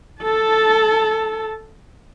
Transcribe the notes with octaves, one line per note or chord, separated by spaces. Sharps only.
A4 A5